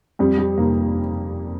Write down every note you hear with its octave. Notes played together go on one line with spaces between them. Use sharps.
F2 G3
G3
F1 A#3